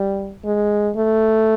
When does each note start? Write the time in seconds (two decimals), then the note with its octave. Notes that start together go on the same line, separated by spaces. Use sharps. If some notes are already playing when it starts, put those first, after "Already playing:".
Already playing: G3
0.44 G#3
0.96 A3